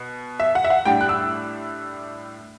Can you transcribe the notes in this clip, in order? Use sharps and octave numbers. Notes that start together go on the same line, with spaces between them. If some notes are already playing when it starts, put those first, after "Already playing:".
Already playing: B2
E5
F#5
E5
F#5
A2 G3 D4 G5
F#6
E6